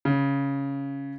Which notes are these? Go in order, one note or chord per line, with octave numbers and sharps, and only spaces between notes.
C#3